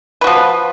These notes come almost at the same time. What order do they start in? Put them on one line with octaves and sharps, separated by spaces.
B4 F#4 F3